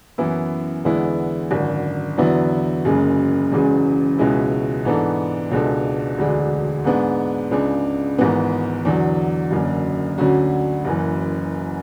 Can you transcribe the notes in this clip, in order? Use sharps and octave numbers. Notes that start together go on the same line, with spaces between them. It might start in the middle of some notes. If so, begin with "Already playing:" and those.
F#2 E3 B3 E4
E2 D3 G#3 B3 E4
G#1 F#2 D3
E2 D3 F#3 B3 E4
F#1 F#2 C#3 G#3
E1 E2 C#3 G#3
C#2 B2 G#3 C#4 E4
G#2 E3 B3 D4 A4
C#2 B2 G#3 D4 A4
E1 D2 D3 G#3
G#2 G#3 B3 D4
C#2 C#3 G#3 D4
G#1 G#2 E3 B3
E2 D3 F#3
F#1 F#2 D3
D2 D3 F#3 C#4 F#4
F#1 F#2 E3